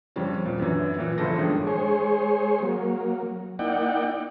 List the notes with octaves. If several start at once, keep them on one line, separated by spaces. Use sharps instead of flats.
F2 C#3 G3 C#4
D#1 A#2
F#2 D3 E3
A#2 E3
G1 F3 E4 A4 A#6
G2 D#3 G#3 C#4
G#3 G#4 C5 C#5
F#3 A#3
A#3 D#4 E4 D5 F#5 G5